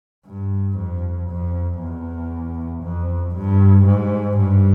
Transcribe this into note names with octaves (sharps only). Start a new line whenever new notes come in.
G2
F2
F2
E2
F2
G2
G#2
G2